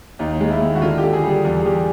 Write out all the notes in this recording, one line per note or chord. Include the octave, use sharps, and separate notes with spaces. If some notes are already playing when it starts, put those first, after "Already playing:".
D#2 D#4
G#3
E4
D#2
F#4
D3 F4
G4
D3
G#4
G3
G#4
E2 G#4
G#4
E2 G4